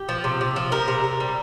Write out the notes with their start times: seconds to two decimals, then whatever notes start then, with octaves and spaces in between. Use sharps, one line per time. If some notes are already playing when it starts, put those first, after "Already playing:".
Already playing: G4
0.09 F3
0.24 C3
0.41 C3
0.56 F3
0.72 G3 A#4
0.88 C3
1.04 C3
1.20 G3